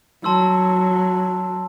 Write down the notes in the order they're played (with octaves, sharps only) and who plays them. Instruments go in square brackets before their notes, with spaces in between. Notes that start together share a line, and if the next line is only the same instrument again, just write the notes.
[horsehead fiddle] F#3 [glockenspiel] A5 C6 E6